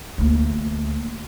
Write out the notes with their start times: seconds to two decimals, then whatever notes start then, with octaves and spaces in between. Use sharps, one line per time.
0.18 D2 A#3